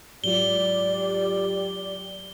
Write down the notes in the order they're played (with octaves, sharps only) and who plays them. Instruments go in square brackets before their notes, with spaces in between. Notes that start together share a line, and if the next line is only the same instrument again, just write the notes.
[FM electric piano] G#2 F#3 F4 [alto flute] G4 [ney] D5 [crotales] G7